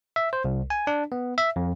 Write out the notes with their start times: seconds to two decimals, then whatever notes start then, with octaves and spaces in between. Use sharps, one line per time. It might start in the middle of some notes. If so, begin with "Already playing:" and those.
0.16 E5
0.33 C5
0.44 C2
0.70 G#5
0.87 D4
1.12 B3
1.38 E5
1.56 F2